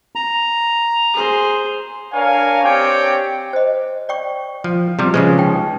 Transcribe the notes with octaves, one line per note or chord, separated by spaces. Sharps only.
A#5
G#4 C5
D4 A#4 C#5 F5 G#5
C4 G4 C#5 D5 G5
C5 D#5
D5 G5 C#6
F3
C3 F3 G3
C#3 F3 G#3 B4 C#6
D#4 G5